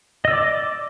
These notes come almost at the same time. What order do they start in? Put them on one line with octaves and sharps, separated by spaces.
D#5 E6 D5 D6